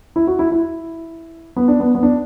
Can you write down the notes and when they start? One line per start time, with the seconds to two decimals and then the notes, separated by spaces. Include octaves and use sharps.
0.16 E4
0.27 F#4
0.39 E4
0.52 E4
1.56 B3
1.68 D4
1.80 B3
1.95 B3
2.03 D4